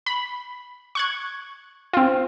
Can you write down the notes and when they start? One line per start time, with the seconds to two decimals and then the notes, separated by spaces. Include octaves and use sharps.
0.06 B5
0.95 C#6 F#6 G#6
1.93 C4 F4